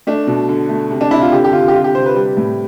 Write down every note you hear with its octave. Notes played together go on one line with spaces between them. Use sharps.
A3 D4
B2
D3
A3
C3
D4
C3 E4
F4
D3 G4
G4
D3 F4
G4
C3 F4
G4
C3 C5
B4
G3
A2